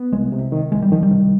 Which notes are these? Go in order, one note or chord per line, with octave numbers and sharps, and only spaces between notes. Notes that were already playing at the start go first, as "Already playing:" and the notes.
Already playing: B3
C2 G#3
C3
D#3
C2 G#3
G3
D#3 F3
G3
C2